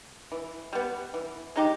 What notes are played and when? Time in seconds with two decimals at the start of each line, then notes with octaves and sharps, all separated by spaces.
0.32 E3
0.73 G3 B3
1.14 E3
1.56 G#3 D#4 G4